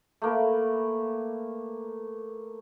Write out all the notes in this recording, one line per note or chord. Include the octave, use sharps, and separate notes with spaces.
A3 A#3 B4